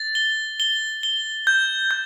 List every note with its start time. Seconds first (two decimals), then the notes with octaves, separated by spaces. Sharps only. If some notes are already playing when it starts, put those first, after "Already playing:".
Already playing: A6
0.15 G7
0.60 G7
1.03 G7
1.47 G6
1.91 G6